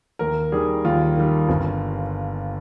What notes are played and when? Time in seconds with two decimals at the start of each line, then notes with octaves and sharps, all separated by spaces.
0.19 D#2 A#4
0.52 D#3 G3 G#4
0.84 D#2 F4
1.16 D#3 G3
1.49 G1